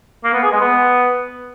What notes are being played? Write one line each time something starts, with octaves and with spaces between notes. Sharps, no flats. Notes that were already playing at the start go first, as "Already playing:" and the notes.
A#3
B3
G#4
G#3
B3